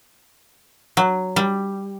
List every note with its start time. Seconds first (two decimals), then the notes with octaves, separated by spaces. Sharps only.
0.97 F#3
1.36 G3